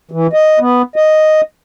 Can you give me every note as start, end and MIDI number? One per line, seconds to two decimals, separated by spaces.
0.11 0.27 52
0.33 0.59 75
0.60 0.82 59
0.96 1.41 75